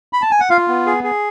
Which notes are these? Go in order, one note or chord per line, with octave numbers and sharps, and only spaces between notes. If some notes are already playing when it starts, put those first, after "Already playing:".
B5
A5
G#5
F#5
F4 F5
B3
G#4
G#4